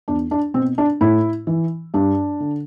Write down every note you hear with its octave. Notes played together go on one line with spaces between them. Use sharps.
E2 D4
D4
B2 C4
D4
A2 E4
E3
G2 D4
D3